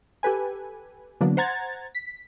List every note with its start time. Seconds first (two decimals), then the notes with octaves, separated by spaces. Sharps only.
0.23 G4 A4 B4 G#5
1.21 D3 E3 F#3 A#3 B3 D4
1.37 C5 F#5 A#5 G#6 A6
1.95 B6